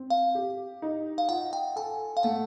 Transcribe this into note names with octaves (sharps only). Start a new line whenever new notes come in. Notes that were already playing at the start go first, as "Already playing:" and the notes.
Already playing: C4
F5
G4
D#4
F5
F4 F#5
G5
A4 G#5
F5
A3 F#5